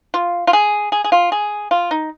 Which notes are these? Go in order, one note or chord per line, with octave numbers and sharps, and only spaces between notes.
F4
F4
G#4
G#4
G#4
F4
G#4
F4
D#4